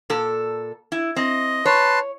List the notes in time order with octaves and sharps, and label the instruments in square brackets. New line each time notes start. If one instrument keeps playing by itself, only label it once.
[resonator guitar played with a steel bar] A#2 A4
E4
[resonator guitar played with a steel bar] C4 [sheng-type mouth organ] D#5
[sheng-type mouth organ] B4 A5 C6 [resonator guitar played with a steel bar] C#5